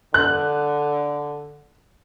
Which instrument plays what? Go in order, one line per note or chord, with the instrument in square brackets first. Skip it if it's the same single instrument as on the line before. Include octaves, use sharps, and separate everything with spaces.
[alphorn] D3 [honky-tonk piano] F#6